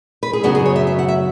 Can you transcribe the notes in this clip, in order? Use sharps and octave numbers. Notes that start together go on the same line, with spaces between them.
B4
G#4
F#2 C#3 F#3 B3 F#4
G#4
C#5
E5
E5
F#5
E5